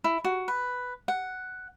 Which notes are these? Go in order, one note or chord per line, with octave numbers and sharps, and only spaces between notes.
E4
F#4
B4
F#5